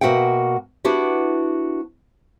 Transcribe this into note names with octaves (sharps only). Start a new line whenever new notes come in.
B2 A#3 F#4 E5 F#5 G5
B3 D4 E4 F#4 G4